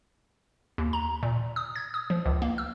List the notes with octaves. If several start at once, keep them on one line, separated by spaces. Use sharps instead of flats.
D#2
A#5
A#2
D#6
G#6
D#6
F3
C#2
A#3
E6